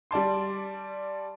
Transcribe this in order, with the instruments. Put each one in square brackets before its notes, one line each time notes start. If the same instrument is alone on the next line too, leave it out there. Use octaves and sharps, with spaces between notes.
[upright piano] G3 D5 A5 C6